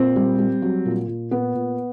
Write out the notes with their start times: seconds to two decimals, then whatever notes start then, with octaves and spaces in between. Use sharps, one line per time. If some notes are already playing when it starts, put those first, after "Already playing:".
Already playing: A#2 C4
0.16 G3
0.39 G3
0.62 F#3
0.85 A#2
1.08 A#2
1.31 A#2 B3
1.55 A#2